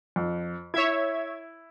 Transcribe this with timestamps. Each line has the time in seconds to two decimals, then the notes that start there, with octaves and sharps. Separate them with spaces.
0.16 F2
0.74 E4 C#5 E5 G#6